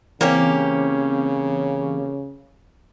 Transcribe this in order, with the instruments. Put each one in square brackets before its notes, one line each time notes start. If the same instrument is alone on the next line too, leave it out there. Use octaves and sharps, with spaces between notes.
[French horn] C#3 [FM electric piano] E3 C4 [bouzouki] A#3 C#4 G4